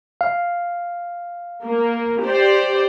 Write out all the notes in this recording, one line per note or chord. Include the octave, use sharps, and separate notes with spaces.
F5
A#3
G4 C5 D5